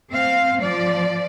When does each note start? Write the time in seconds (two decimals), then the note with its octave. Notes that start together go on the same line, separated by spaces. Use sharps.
0.10 C4 F5
0.60 F3 D5